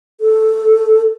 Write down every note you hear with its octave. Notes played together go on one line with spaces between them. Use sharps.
A4